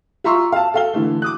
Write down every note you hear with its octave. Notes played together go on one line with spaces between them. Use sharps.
F4 E5 A#5 C6 C#6 E6
F5 A5
A4 F5 G7
D3 E3 A3
D6 D#6 F#6